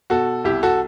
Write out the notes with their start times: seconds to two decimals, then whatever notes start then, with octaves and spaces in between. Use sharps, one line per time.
0.10 B2 F#4 A4
0.44 C2 E4 G4
0.63 F#4 A4